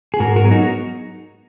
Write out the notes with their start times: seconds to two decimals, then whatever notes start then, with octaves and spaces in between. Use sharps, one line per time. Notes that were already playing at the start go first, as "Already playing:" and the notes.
0.14 G#4
0.19 G#2 F#4 A#4
0.36 F#4 A#4
0.44 F#3 B3 G#4
0.51 D#4 F#4